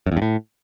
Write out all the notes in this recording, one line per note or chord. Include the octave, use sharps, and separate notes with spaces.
F#2
E2
G2
A2